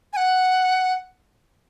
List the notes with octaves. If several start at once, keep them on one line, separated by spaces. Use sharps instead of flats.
G#5
F#5